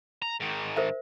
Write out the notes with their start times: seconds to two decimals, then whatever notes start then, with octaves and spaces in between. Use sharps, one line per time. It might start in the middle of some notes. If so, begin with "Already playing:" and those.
0.22 A#5
0.40 G#2 D#3
0.77 A#4 C5 E5